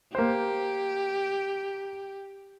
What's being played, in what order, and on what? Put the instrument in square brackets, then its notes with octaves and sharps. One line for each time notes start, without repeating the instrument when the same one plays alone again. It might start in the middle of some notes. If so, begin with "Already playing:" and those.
[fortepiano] A#3 C5 [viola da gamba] G4